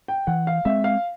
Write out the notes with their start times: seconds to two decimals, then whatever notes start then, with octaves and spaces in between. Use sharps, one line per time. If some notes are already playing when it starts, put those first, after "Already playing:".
0.08 G5
0.27 E3 F#5
0.47 F5
0.65 G#3 C4 E5
0.84 F5